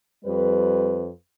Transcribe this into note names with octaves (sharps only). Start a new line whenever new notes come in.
F2 G3 B4